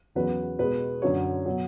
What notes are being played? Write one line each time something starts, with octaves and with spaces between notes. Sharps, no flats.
E2 C#3 F#3 B4
B2 G#3 B4
F#2 D3 F#3 C#5
B2 F#3